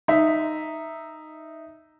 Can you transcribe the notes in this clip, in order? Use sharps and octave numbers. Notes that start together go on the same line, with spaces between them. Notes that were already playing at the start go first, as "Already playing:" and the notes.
D#4 E5